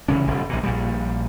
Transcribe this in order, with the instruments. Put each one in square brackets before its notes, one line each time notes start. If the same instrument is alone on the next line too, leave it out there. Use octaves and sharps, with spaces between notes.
[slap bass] F1 C#3 E3 C#4
F1 B2 G3
A#1 A#2
A#1 A#2 G3